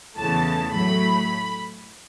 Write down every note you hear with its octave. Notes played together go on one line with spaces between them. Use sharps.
E2 C#3 E3 A3 A5
A2 F#3 A3 B5